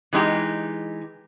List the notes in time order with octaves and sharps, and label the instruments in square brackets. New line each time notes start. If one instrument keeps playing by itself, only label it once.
[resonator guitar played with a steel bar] E3 G#3 D#4 G4